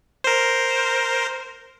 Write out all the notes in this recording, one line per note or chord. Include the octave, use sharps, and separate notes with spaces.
A#4 C5